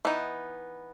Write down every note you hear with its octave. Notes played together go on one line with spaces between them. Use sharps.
E3 B3 D#4